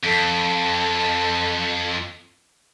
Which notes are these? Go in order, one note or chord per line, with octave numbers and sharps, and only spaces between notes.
F2 A4